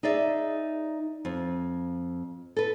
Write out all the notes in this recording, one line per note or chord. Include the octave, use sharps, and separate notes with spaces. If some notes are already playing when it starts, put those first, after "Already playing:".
D#4 G#4 D5 E5
F2
A4 B4